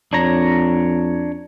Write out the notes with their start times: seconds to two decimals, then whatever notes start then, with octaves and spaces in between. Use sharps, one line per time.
0.13 F2 D4 C#5 A#5